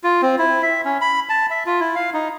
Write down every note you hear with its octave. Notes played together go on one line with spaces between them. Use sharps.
F4
C4
E4
E5
C#4
B5
A5
E5
F4
E4
F5
D#4